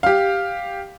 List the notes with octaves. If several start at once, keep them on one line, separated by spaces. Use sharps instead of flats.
G4 F5